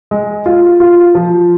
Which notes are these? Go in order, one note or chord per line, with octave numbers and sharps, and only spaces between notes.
G#3
F4
F4
F3